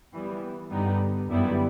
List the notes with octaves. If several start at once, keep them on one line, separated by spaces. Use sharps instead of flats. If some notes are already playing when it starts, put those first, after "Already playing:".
E3 G3 B3
G2 D3 G3 B3 D#4
F#2 D3 G3 B3 E4